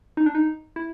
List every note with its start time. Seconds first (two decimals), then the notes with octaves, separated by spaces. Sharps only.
0.17 D#4
0.26 D4
0.35 D#4
0.76 E4